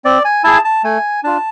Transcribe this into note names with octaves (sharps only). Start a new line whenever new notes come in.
C4 D5
G#5
E4 G#4 A5
A5
A3 G#5
D4 F4 A5